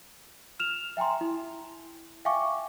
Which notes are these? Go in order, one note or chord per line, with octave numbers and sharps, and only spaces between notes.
F6 E7 F7
E5 G5 G#5 A#5 C6
E4
E5 F5 G5 G#5 C#6 D6